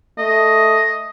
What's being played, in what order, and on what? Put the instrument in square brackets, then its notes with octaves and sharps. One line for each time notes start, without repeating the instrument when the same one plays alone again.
[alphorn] A3 [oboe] D#5